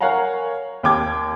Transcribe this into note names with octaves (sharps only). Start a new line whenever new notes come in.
A#4 C#5 F5 F#5 G#5 A#5
D#2 G5 D6 G#6